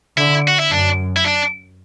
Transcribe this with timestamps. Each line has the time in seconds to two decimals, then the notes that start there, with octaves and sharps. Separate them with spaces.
0.17 D3 E4
0.48 F#4
0.59 E4
0.71 F#2 D4
1.17 E4
1.25 D4